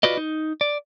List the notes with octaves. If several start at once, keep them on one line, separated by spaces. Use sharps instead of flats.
F4 F#4 B4 D5 D#5
D#4
D5